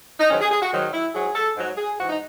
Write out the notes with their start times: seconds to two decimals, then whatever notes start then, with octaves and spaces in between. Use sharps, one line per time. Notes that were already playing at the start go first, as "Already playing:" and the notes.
0.20 D#4
0.31 G#2 D#3 F#3 C#4
0.41 G#4
0.51 G#4
0.61 F#4
0.72 G#2 D#3 F#3
0.93 E4
1.15 G#2 F#3 G#4
1.35 A4
1.56 G#2 F#3
1.77 G#4
1.99 G#2 E3 F#4
2.09 D#4